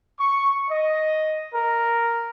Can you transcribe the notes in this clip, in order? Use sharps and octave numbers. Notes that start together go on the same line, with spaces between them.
C#6
D#5
A#4